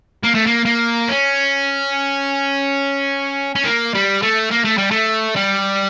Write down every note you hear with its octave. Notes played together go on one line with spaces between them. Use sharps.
A#3
A3
A#3
A#3
C#4
C#4
A#3
G3
A3
A#3
A3
G3
A3
G3